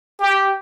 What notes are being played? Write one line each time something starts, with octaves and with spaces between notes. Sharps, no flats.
G4